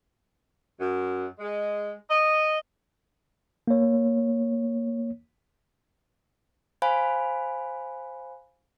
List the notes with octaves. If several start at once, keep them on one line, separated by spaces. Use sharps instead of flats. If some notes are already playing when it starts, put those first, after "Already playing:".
F#2
G#3
D#5
A#3 C#5
C5 F5 G#5 B5